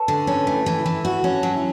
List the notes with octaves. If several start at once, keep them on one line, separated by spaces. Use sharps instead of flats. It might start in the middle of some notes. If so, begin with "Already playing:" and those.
Already playing: A4 B4 C#5
D3
C#4 G4 B4
A3
E4 G4
E3
E4
E3
E4 F#4
C#4
D4
F#3
E4